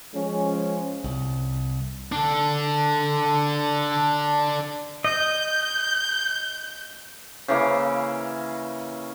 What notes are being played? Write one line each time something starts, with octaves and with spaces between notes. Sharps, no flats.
F3 G#3 C#4
C2
D4 A4
D#5 G6
C#3 E3 A#3